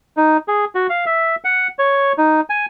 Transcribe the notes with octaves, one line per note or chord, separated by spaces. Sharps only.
D#4
G#4
F#4
F5
E5
F#5
C#5
D#4
G#5